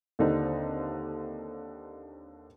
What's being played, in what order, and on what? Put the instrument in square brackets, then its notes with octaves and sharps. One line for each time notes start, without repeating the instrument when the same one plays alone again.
[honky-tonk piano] D#2 D3 C4 D#4